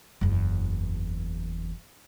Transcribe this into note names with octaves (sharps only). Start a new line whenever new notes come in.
F#1 E2